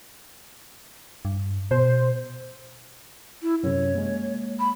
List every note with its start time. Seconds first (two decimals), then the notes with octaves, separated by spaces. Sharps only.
1.25 G2
1.71 B2 C5
3.42 E4
3.63 F#2 C3 C#5
3.95 G#3 A#3
4.60 B5